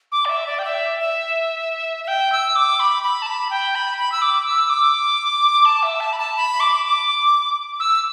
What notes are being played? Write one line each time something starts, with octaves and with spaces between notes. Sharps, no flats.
D6
D5
E5
D5
G5
E5
E5
E5
G5
E6
D6
B5
B5
A5
B5
G5
B5
B5
E6
D6
E6
D6
A5
E5
A5
B5
A5
B5
D6
D6
E6